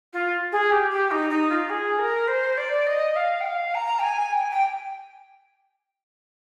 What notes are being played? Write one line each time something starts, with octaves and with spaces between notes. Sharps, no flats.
F4
G#4
G4
G4
D#4
D#4
F4
G#4
A#4
C5
D5
D#5
F5
G5
F5
A#5
G5
G#5
G5
G#5
G5